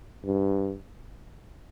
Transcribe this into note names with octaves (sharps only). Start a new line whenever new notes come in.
G2